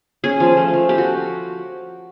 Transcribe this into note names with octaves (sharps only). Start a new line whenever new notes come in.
C#4 G#4
F3
A3
F3
F3 G4
F#4